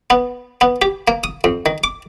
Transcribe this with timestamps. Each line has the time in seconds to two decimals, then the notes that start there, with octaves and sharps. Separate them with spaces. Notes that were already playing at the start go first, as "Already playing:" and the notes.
0.10 B3
0.61 B3
0.82 G4
1.08 A#3
1.24 D#6
1.44 F2
1.66 D#3
1.84 D6